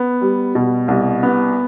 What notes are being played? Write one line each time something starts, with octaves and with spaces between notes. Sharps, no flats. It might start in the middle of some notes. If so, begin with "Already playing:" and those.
Already playing: B3
G3
B2
C2
B3